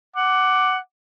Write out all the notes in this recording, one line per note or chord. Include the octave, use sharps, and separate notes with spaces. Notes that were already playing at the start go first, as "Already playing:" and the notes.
F#5 D6